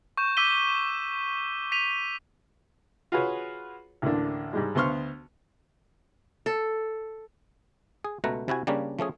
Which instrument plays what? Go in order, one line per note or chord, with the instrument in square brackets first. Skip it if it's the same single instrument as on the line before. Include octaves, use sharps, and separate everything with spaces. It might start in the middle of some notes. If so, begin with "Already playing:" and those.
[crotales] C#6 G6 E7
D6 E6 B6 D#7 G7
B6 D#7 F7
[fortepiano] F4 F#4 G#4 B4 C#5
A1 D2 D3 A#3 D4
G#2 G3 G#3
D2 B3 C5 C6 C#6 F6
[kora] A4
[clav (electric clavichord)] G#4
C#2 B2 A3 B4 F#5 A#5
C3 E4 F#4 G#5
C#3 G3 A#3 C#4 D4
F3 A3 C#4 G#4